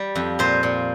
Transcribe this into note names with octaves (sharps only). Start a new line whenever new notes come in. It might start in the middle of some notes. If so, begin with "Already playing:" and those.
Already playing: G3
F2
A#2 C5
A#2